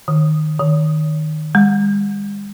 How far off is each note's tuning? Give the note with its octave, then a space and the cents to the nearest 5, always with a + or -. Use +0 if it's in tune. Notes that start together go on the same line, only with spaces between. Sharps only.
D#3 -15
D#3 -10
G#3 -45